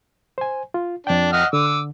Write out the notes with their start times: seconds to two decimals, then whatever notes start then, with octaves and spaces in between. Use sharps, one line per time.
0.38 C5 G#5
0.74 F4
1.07 F2 D4 G5
1.33 D#5 F#5 F6
1.53 D3 D6 E6